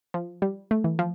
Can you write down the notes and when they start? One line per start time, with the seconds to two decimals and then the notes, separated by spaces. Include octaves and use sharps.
0.14 F3
0.42 G3
0.71 A3
0.84 E3
0.99 F3